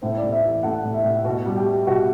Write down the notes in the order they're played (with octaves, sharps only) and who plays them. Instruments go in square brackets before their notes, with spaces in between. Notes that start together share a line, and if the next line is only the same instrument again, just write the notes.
[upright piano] A2 C5
D5
A2
E5
E3
E5
A3 F#5
A2
E5
A2
B2 F#4
G3
G4
G3
B2 F#4